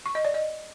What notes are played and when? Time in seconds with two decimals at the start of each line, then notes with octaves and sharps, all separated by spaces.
0.06 C#6
0.15 D#5
0.25 D5
0.34 D#5